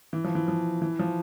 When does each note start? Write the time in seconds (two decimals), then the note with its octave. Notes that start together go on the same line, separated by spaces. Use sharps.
0.13 E3
0.24 F3
0.35 E3
0.48 F3
0.82 E3
0.99 F3